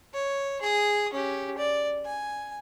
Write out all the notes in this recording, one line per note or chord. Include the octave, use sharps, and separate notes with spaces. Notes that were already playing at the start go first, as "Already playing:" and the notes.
C#5
G#4 D#6
C#4 G4
D5
G#5